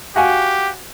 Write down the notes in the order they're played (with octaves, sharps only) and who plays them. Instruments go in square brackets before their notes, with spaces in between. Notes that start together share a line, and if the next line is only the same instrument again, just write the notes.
[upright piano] F#4 F5 G#5 [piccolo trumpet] G4